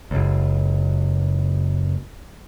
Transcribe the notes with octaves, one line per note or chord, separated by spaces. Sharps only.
F#1 C#2